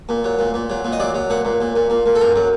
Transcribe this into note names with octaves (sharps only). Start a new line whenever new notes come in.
A#2
F#3
A#2
A#2
F#3
A#2
D#5
F#3 D5
F#3
A#2 F#5
A#2
A#2
A#2
A#2
A#2
A4
F#2 A#4
F#3